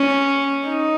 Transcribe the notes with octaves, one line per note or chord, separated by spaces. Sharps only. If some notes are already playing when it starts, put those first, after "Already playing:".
Already playing: C#4
D#4